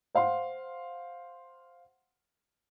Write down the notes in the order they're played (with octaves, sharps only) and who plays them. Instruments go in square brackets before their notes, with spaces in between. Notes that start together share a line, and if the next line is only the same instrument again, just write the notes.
[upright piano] C5 F5 F#5 C6